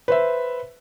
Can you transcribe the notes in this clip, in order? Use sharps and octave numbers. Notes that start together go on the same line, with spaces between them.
B4 C5 E5